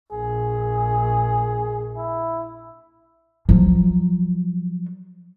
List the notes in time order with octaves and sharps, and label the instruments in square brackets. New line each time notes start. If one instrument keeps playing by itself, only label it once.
[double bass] A#1 [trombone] G#4
[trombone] E4
[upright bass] F3 F#3